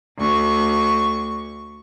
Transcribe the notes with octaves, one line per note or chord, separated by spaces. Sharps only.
D2 C#6